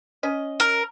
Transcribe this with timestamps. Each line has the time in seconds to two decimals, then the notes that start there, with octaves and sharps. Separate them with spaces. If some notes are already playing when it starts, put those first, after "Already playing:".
0.23 C#4 D#5
0.60 A#4